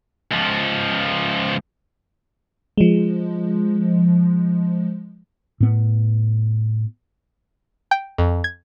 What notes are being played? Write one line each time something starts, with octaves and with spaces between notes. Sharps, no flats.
C#2 F3
F3 G#3
A2 B3
G5
F2
G#6